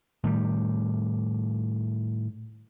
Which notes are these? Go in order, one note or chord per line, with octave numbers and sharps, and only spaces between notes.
A2 D#3 G3